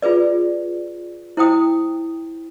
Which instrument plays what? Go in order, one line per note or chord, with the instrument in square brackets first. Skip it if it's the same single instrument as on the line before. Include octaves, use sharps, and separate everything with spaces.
[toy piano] F4 G#4 B4 D5
E4 C5 G5 D#6